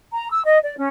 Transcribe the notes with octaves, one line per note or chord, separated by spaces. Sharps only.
A#5
E6
D#5
D5
C#4